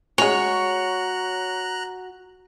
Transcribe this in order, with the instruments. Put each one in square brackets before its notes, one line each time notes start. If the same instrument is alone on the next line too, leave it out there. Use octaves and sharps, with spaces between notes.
[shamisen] G#3 C#4 [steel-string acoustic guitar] F#4 [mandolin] C#5 [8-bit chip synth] A#5 F#6